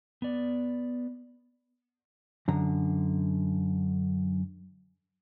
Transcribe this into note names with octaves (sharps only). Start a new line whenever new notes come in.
B3 D5
F#2 D3 A#5